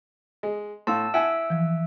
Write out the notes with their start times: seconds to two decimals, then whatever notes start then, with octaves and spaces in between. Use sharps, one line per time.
0.43 G#3 D#5
0.87 A2 F5 A5 C6 E6
1.14 E4 E5 F#5 G#5 E6 D7
1.50 E3 F3